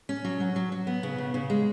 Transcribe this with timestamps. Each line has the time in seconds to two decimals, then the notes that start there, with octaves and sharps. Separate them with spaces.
0.09 C#4
0.25 F#3
0.40 F#3
0.56 F#3
0.72 F#3
0.87 B3
1.03 C#3
1.18 C#3
1.34 C#3
1.50 G#3